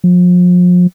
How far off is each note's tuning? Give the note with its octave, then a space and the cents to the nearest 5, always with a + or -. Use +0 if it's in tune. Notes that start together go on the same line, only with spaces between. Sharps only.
F3 +35